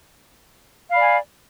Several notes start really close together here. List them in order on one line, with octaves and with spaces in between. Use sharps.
F5 B5 D5 G#5